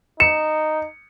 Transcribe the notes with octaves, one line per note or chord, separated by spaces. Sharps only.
D#4 C#7 E7